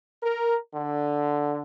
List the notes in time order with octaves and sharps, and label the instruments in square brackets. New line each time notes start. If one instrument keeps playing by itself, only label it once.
[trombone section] A#4
D3